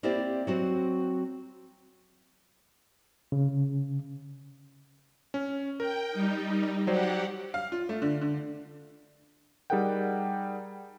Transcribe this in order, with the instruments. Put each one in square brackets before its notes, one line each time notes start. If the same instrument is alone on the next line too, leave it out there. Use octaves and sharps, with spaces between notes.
[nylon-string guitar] A#3 C4 E4 G4 C5 D5
F#3 C4 F#4 C5
[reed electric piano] C#3
[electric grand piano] C#4
[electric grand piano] A#4 [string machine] G5
[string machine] G3 D#4
[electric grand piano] F#3 C5 D5 [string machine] G4 F#5
[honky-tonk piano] F5
F4
A3
D3
D3
[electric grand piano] G3 D#4 G#4 A#4 F#5 G5